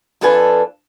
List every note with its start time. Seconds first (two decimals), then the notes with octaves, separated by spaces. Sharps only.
0.21 F2 D4 F4 A4 B4 G#5